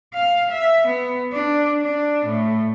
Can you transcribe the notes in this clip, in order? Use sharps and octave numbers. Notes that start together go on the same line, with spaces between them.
F5
E5
B3
D4
D4
A2